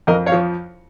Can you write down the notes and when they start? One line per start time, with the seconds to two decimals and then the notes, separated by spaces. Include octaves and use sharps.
0.07 F2 A#4 D#5
0.26 C#5 F5
0.32 F3